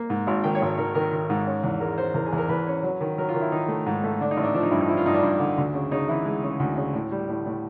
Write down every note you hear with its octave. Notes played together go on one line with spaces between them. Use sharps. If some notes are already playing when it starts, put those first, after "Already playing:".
Already playing: A#3
G#2
G#1
D#3 G5
C#5
G#1
D#3 A#4
D#3 A#4
D#3
G#2
C#4
E2
G#3 A#4
C#4 C5
E2 A#4
G#4
E2 A#4
E2 B4
C#4
F#3
D#3
F#3 A#4
F4
D#3
E4
D#3 D#4
A3
G#2
A3
D3 D4
D#4
A1
D4
F3 D4
D#4
G2 E4
D#4
F3 E4
F4
G2 D#4
D4
G2
D3
D2
C#3
C#3 D#4
E3 E4
G#3
C#3
D2
C#3
A2
G3
A2
A2